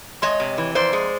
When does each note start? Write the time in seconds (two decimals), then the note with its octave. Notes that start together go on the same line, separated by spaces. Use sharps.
0.22 G#3 C#5 D#5
0.40 C3
0.58 E3
0.75 F2 C5 D5
0.93 G#3